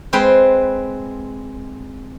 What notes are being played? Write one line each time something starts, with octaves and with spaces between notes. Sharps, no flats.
G#3 C4 B4 G5